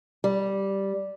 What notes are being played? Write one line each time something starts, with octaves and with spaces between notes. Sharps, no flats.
G3